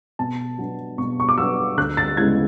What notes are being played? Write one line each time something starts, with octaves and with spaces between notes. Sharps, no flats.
B2 A5
F#3 B3 D4
B2 C#6
C#6
D6
F#3 B3 D4 E6
D2 F#6
A6
C#3 G#3 B3 E4 G#6